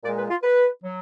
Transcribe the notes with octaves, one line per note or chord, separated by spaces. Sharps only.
A#2 G#3 D5
B4
F4
B4
F#3